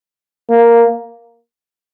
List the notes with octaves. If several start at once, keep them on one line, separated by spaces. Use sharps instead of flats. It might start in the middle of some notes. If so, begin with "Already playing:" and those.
A#3